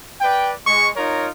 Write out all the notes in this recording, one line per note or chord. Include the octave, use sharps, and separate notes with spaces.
B4 D5 G5
G#3 C#6
D#4 F4 A#4 C#5